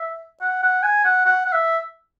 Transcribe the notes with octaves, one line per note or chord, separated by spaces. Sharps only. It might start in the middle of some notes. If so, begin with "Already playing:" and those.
Already playing: E5
F#5
F#5
G#5
F#5
F#5
F#5
E5